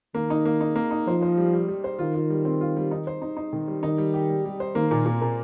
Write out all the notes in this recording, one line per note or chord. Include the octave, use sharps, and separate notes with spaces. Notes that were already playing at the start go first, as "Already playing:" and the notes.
D#3 A#3
D#4
A#3
D#4
A#3
D#4
F3 C5
C5
G3
G3
G3
C5
D#3 F4
F4
G3
C4
F4
G3
D#4
C5
D#4
D#4
D#3
G3
D#3 D#4
G3
G4
G3
G3
C5
D#3 A#3
A#2
A#2
A#2